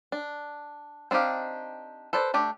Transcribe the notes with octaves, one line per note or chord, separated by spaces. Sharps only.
D4
C4 D4 D#4 G4 F5
A4 B4 C5 D5
A3 D4 G4